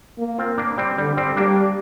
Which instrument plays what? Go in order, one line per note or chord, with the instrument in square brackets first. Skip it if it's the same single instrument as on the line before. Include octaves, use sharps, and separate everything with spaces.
[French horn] A#3
[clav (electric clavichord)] C4 F4
A#3 D4
G3 C4
[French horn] D3 [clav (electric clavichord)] G3
[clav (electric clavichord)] G3 C4
[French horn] G3 [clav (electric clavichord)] A#3 D4